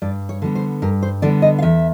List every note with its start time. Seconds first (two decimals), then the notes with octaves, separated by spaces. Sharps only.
0.02 G2 D5
0.29 C#5
0.42 D3 G3 B3
0.55 C5
0.82 G2 A#4
1.03 C5
1.22 D3 G3 B3 D5
1.42 D#5
1.59 F5
1.62 E2 E5